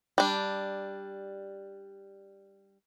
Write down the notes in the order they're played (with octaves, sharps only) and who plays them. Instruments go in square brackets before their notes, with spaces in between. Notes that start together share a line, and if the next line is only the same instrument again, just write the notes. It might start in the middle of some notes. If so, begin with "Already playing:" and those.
[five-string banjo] G3 D4